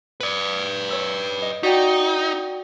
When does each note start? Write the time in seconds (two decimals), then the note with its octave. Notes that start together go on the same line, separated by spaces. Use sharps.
0.20 B4 D5
0.91 C#5 E6
1.42 D#5
1.63 D#4 F#4 D5 G5